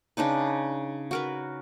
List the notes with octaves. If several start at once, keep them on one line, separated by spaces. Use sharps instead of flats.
C#3 D4 D#4 B4
F#4 A#4 B4